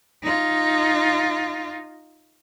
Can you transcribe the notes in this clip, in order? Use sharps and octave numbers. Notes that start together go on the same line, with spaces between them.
D#4 F4